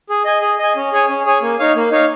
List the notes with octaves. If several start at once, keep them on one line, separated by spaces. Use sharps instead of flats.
G#4
D#5 G#5
G#4
D#5 G#5
C#4
G#4 C#5 G#5
C#4
G#4 C#5 G#5
A#3
D#4 C#5 F5
A#3
D#4 C#5 F5